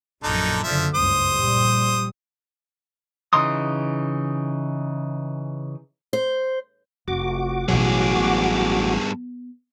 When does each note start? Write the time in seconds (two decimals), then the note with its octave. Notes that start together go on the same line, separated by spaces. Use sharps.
0.23 A#1 F#2 D3 D#4 A4
0.64 F#1 D3 F3 E5
0.95 F#1 C#2 G2 C5 D#6
1.34 A#1 G3
3.33 C#3 E3 D#4 C6 D#6
6.13 C5
7.08 F1 F#4 D6
7.68 A1 G2 B2 D#3 F#3 G#4
8.16 B3